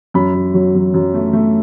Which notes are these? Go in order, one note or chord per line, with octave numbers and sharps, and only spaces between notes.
F#2 B5
F#2
F#3
F#2
F#2
A3
A3